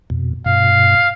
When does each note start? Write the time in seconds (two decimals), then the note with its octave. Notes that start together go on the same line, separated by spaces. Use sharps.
0.10 F2 B2
0.46 G2 B2 F5